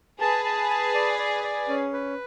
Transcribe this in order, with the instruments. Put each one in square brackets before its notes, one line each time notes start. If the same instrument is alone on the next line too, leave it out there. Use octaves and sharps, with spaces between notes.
[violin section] G#4 B4 [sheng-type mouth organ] A5
[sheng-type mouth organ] A5
A5
D5
D5
D5
C#4
B4